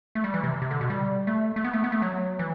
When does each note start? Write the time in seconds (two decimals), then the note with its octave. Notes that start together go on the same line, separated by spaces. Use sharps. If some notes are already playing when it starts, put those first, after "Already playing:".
0.15 A3
0.24 G3
0.34 E3
0.44 C3
0.62 C3
0.71 D3
0.81 B2
0.90 G3
1.27 A3
1.56 A3
1.64 B3
1.73 A3
1.84 B3
1.92 A3
2.02 F#3
2.39 E3